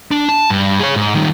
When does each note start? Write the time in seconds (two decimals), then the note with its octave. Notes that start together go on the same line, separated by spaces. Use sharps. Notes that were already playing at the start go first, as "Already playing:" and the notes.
0.11 D4
0.29 A5
0.50 G2
0.80 G#4 C#5
0.96 G#2
1.15 D#3 G3